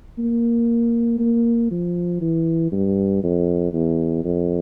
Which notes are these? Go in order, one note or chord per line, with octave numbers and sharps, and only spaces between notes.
A#3
A#3
F3
E3
G2
F2
E2
F2